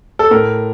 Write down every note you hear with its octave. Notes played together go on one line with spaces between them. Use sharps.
A4
A2 A#4